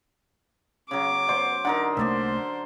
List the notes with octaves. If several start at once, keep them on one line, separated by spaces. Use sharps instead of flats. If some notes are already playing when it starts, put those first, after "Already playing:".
C#3 F#3 D6
B3 C5 D5
D3 D#4 A#4 F#5 A#5
C2 A3 A#3 C5 D5 E5